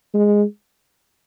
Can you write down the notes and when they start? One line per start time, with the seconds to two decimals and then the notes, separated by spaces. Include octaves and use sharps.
0.14 G#3